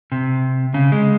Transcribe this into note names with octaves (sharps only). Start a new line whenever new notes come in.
C3
C#3
G#3